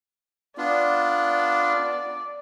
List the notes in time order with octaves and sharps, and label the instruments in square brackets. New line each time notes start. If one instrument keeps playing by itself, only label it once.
[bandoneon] B3 D4 F4 [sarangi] D5